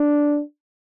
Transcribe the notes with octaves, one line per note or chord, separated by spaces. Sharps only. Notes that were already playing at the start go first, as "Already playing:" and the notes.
Already playing: D4